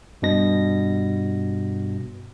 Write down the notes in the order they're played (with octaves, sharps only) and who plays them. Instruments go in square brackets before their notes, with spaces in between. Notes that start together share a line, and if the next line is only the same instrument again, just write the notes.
[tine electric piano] G2 B2 A#6